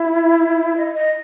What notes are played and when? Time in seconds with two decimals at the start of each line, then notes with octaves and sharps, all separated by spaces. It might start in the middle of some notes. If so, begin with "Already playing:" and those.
Already playing: E4
0.77 D#5
0.95 D#5